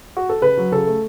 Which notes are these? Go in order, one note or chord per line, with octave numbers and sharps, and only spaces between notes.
F#4
A4
C#3 B4
F#3
C#3 A4
A3